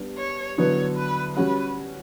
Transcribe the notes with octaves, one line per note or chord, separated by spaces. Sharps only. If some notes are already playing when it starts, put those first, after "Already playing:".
Already playing: G3 B3 D4 G4
C#5
D3 F#3 B3 E4 C#5
B4
G3 C#4 F#4 B4